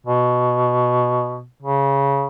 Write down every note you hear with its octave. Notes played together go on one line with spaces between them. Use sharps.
B2
C#3